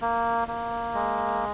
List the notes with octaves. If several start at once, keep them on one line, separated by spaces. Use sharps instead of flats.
A#3
A#3
G#3